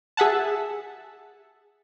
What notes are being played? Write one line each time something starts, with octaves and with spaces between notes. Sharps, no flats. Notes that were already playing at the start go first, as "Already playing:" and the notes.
G#4 E5 F#5 A5